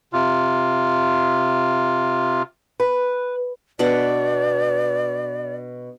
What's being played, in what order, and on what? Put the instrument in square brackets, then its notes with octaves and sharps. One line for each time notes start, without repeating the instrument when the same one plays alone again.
[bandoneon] C3 F4
[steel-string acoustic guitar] B4
[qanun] B2 D4 F#5 [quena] D5